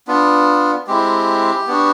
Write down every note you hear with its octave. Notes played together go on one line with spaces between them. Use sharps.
B3 D4 F4
G#3 C4 E4 G4
B3 D4 F#4